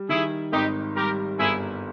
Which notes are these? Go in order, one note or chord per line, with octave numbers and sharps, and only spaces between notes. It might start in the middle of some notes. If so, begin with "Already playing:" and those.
Already playing: G3
D#3 E4 G#4
G#1 D#4 G4
G3 G4 A#4
G1 E4 G#4